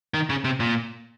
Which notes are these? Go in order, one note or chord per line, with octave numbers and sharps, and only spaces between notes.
D#3
C#3
C3
A#2